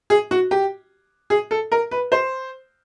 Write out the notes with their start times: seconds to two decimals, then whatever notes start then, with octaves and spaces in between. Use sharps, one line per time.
0.10 G#4
0.31 F#4
0.51 G4
1.30 G#4
1.51 A4
1.72 A#4
1.91 B4
2.12 C5